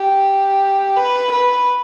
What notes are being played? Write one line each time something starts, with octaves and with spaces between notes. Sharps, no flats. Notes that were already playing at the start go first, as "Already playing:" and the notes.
Already playing: G4
B4
B4